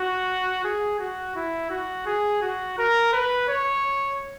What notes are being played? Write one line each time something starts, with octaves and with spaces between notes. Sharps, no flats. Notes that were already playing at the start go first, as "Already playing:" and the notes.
Already playing: F#4
G#4
F#4
E4
F#4
G#4
F#4
A#4
B4
C#5